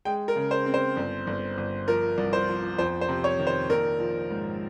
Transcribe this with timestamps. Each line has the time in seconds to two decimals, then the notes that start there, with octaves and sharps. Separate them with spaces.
0.05 G#3 G5
0.28 A#4
0.36 C#3
0.51 C5
0.66 C4
0.74 C5
0.96 G1
1.27 G1
1.58 G1
1.87 F3 A#4
2.18 C2
2.33 C5
2.48 F3
2.78 F2 C5
3.01 C5
3.09 C3
3.24 C#5
3.39 D#3
3.47 C5
3.69 A#1 A#4
4.00 F3
4.30 G#2